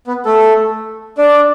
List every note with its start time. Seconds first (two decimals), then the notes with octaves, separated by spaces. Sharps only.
0.07 B3
0.25 A3 A4
1.18 D4 D5